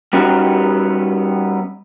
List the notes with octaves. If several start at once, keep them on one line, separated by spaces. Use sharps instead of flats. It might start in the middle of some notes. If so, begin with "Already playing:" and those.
G3 B3 C#4 D#4 F#4 G4